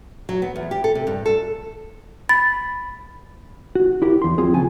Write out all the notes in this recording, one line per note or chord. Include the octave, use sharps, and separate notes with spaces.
F#3
B3
E2
G4
A4
C3
G2
A4
B5 A6
F#4
E4 G4 A#4
E2 C6
F3 C4 F4 G#4
D#2 C#3 F3 F4 G#5